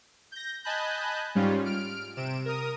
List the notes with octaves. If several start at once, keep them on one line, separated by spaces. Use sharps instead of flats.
G6 A#6
D#5 G#5 A5 B5 F#6 G6
G#2 G3 C#4 F4
F6 D7
C3 D7 E7
A#4 D#6